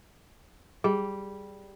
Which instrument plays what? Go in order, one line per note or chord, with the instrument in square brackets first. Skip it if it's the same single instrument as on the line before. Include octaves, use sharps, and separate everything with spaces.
[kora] G3 [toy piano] G#4